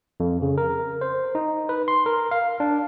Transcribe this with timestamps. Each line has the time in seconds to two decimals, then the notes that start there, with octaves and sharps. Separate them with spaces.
0.20 F2
0.42 C#3
0.58 A#4
1.01 C5
1.35 D#4
1.69 B4
1.88 C6
2.06 A#4
2.31 F5
2.60 D4